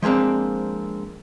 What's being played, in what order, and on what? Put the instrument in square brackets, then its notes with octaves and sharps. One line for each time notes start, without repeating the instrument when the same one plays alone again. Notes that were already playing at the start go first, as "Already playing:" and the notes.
[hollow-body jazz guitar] F3 G#3 A#3 C4 D4